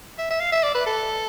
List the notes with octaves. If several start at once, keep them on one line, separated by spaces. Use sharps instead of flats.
E5
E5
F5
E5
D5
B4
A4